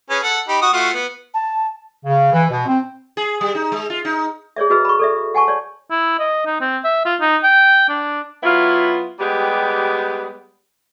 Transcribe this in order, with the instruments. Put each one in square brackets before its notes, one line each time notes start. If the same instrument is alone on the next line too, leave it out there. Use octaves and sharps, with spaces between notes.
[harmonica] C#4 G#4 B4
A4 F#5
D#4 G4 B5
F#4 D#6
A3 F4 F#4
B3
[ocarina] A5
[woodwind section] C#3
E3
B2
C4
[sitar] G#4
G3
D#4
G#3
F4
D#4
[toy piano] G#4 C#5 D5 E5
F#4 G#4 B4 D#5 A#5 E6
B5 C#6
A4 D5 E5
F#5 G#5 A5 C#6
C#5 D5
[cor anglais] E4
D#5
D#4
C4
E5
F4
D#4
G5
D4
[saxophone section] F#3 B3 E4 F4
G3 G#3 B3 G4